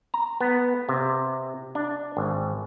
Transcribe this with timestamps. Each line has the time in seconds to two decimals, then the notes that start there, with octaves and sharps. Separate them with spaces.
0.14 A#5
0.41 B3
0.89 C3
1.75 D4
2.17 G#1